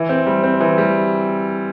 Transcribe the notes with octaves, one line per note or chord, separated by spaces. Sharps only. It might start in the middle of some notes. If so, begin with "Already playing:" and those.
Already playing: E3
C4
G3
C4
E3
G3